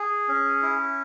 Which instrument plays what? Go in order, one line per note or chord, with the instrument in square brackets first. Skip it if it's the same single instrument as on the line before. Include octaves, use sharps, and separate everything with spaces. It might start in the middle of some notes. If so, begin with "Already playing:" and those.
Already playing: [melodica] G#4
C#4
E4